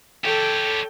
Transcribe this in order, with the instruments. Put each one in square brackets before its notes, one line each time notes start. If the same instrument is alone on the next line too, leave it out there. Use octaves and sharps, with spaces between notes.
[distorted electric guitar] G4 C#5 [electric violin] A4 G5